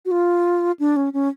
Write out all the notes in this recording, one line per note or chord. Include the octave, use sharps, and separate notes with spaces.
F#4
F4
D4
C#4
C#4